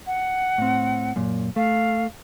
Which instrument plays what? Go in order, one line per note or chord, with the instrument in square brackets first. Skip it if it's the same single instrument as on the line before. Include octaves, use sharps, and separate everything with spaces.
[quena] F#5
[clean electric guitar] A2 C4
F#2 A#2
[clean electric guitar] A3 [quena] F5